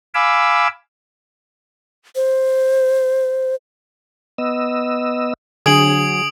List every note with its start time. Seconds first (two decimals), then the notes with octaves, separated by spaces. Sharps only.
0.15 F5 G#5 B5 D6 E6
2.16 C5
4.38 B3 D#5 E6
5.66 D3 F#3 D4 G#4 D#6 G#6 D7 F#7